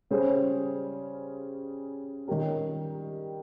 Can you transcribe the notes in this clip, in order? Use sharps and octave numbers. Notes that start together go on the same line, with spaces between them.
C#3 G3 C#4 G#4 C5
D#3 G3 C#4 G4 A#4